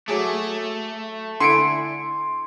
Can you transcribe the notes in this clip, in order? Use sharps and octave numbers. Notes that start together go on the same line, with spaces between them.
F#3 A3 G#4 D6
D3 E4 G#5 C6 C#7 D7